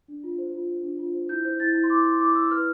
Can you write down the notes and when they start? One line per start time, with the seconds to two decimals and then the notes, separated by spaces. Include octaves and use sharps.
0.08 D4
0.24 F4
0.38 C5
0.54 F4
0.69 C5
0.83 D4
0.99 F4
1.14 C5
1.29 E4 G6
1.45 C5 G6
1.60 E4 A6
1.75 E4
1.84 C6
1.90 E4 D6
2.05 E4 C6
2.20 E4 D6
2.35 E4 E6
2.51 B4 F6